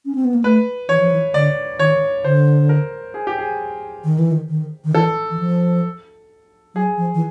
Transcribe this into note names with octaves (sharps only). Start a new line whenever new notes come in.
C#4
C4
B3
A#3
A3 B4
E3 C#5
F3
E3
D3 D5
D#3 C#5
D3 C5
A#4
G#4
G4
G#4
D#3
E3
D#3
D#3
D#3
E3 A4
E3
F3
F#3 G#4
F3
E3